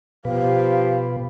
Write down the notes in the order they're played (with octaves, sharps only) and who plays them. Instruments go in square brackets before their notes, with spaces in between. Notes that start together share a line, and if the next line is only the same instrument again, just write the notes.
[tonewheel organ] B2 B4 [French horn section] F3 G4 [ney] F5